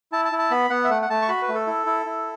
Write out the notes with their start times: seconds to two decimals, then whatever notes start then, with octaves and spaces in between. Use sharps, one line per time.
0.12 E4 A5
0.25 A5
0.32 E4
0.39 A5
0.51 B3 B5
0.70 B3 F#5
0.85 E5
0.90 A3 F#5
1.02 F#5
1.10 A3 A5
1.22 C#6
1.28 F#4 B5
1.42 B4
1.49 A3
1.55 A4
1.67 E4
1.86 E4
2.06 E4